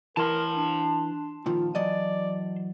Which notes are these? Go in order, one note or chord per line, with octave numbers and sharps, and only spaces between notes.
E3 A#4 A5 C6
D4
A#2 D#3 F3 F4
E3 F#3 D5 D#5